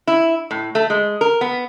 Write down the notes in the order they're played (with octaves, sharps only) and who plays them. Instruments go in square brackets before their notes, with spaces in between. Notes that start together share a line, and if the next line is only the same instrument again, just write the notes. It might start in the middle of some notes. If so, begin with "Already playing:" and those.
[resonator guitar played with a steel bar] E4
A2
A3
G#3
A#4
B3